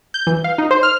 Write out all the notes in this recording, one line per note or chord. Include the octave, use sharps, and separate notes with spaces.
G6
E3
F5
D#4
C5
F6